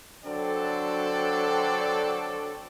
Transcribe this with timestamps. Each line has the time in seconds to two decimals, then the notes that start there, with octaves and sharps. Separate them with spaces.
0.25 D3 F#3 C4 D4 A4 D5